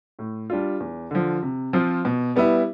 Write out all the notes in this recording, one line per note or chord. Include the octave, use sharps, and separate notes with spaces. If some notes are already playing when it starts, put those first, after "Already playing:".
A2
G3 D4 F4
E2
D3 F3
C3
F3 C4 F4
B2
G3 B3 E4